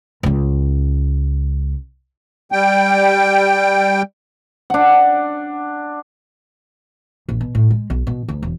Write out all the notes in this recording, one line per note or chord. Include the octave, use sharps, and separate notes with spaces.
C#2 C#4
G3 G5
D4 F#5
A#1
B2
A2
G#3
B1
B2
D2
E1